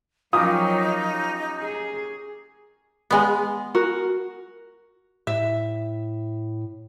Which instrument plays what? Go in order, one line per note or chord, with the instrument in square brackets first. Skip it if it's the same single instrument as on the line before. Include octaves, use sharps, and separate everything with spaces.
[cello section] F3 F#3 [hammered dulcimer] C#4 G4 A#4 [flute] D#4 [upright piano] F4 D#6
[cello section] G#4
[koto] G#3 B3
[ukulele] F#4 A#4
[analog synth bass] A2 [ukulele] E5